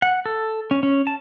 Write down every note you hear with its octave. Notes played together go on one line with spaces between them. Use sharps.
F#5
A4
C#4
C#4
A5